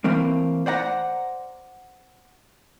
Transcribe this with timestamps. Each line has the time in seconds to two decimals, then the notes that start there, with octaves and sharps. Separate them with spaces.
0.04 E3 A3 A#3 C4
0.66 C5 D5 F#5 A#5